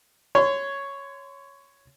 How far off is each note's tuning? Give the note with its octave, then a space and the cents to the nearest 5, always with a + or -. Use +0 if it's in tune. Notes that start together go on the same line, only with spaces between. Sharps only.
C#5 +0 C6 -30